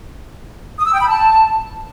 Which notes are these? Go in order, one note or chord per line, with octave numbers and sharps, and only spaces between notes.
D#6
E6
G5
B5
A5